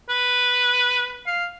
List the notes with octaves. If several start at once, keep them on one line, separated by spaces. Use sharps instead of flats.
B4
F5